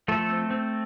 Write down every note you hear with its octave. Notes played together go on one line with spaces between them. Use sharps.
F3 A3 A4
C4
C4